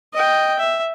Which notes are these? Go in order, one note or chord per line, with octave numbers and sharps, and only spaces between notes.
D#5 G5
E5